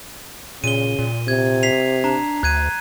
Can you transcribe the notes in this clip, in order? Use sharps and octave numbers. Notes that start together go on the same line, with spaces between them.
A#2 C#3 D#7 G7
A#2
C3 G#6
B6 C7 F7
D4 A#5
D2 F#6 G#6 D#7